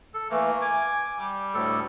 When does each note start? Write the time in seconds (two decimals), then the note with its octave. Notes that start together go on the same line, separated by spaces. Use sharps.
0.14 A4
0.30 E3 A3 A#3
0.62 G#5 D6
1.18 G3
1.54 D2 A2 A4